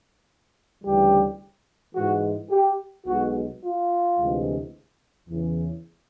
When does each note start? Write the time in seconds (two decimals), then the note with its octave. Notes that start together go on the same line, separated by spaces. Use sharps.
0.84 D2 C#3 E3 G3 G4
1.95 G#2 E3 G#3 F#4
2.51 G4
3.07 B1 B2 G#3 F#4
3.62 F4
4.18 D2 C3 E3 G#3
5.29 E2 C#3 E3